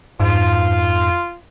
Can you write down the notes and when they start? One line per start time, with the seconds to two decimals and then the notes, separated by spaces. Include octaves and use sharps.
0.20 F2 G#2 F4